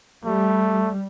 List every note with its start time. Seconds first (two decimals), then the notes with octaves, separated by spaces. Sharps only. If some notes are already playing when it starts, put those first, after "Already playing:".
0.25 G3 A3